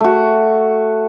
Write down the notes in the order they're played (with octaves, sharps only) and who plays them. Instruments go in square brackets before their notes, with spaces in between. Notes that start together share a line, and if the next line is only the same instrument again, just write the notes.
[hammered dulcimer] A3 F#4